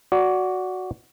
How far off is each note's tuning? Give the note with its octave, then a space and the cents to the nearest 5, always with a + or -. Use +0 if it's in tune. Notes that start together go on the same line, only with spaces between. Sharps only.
F#4 +0 D5 -15